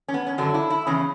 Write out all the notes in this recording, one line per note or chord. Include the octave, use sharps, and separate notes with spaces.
C#4
B3
C#4
F#2 D3 F#3 D4
E4
E4
E2 C#3 C#4